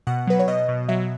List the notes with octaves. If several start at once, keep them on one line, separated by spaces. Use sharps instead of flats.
B2 F#5
F#3 B4
C#5
B2 D#5
B2
F#3 E5